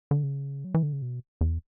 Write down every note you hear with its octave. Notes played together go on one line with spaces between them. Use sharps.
D3
C#3
F#3
E3
D3
C#3
B2
E2